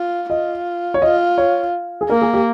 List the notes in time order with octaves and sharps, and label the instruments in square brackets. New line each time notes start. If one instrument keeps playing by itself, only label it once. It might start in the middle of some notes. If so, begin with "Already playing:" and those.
Already playing: [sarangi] F4
[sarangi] F4 [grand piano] D#5
[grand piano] C#5
[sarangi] F4 [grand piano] D#5
[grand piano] C#5
G#4
[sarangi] A#3 [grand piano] A#4
[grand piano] G#4
G4